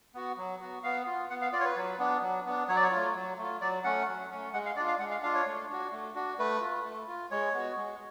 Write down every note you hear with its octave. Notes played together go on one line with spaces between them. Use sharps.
B3 F#4
F#3
B3 F#4
B3 F5
F4
B3 F#5
F5
F4 D5
C#5
B4
F#3
B3 D4
F#3
B3 D4
F#3 C#5
D5
C#5
A3 F4
F#3
A3 F4
F#3 D5
A3 C#4 F#5
F#3
A3 C#4
G#3 F#5
F5
D4 F4 D5
F5
G#3 F#5
F5
D4 F4 F5
C#5
A3
D4 F#4
A3
D4 F#4
A3 B4
F4
A3
F4
G#3 C#5
B3 F#4
G#3